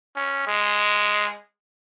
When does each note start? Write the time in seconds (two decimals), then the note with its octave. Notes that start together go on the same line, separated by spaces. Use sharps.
0.16 C#4
0.47 G#3